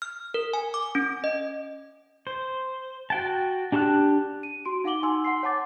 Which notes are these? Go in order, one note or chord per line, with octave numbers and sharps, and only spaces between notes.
F6
A#4
G#5
D6
C#4
D#5
C5
F#4 G5 A5
D4 G4 A5 C6 F#6
D#7
F#4 C6 D7
D#4 F5 F#5 D6 F#7 G7
D#4 G#5 C6 E6
F#5 C6 C7
C#5 F#5 A5 D6 A6